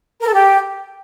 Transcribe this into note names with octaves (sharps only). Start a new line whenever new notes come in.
A#4
A4
G4